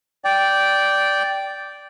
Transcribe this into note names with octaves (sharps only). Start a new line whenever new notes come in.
D5 G5